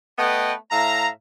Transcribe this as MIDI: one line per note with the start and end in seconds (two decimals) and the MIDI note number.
0.18 0.53 57
0.18 0.53 59
0.18 0.53 71
0.18 0.53 75
0.18 0.53 79
0.71 1.08 45
0.71 1.08 76
0.71 1.08 77
0.71 1.08 82